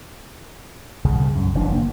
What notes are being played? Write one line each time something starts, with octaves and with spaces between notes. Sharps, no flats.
C2 C#3
F#2
F#1 E3 D4
A#3